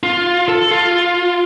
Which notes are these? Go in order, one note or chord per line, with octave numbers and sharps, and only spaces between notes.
F4
A4
F4